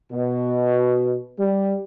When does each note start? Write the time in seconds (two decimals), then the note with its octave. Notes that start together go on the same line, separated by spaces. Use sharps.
0.12 B2
1.39 G3